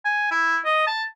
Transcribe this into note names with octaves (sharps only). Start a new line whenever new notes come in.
G#5
E4
D#5
A5